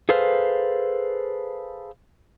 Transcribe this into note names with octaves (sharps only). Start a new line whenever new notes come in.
G#4 A4 B4 C5 F5